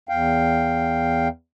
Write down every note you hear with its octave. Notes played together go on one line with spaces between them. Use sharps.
E2 F5 G5